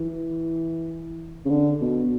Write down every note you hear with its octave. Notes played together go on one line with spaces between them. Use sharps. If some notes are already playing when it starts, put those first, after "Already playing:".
Already playing: E3
C#3
D3
B2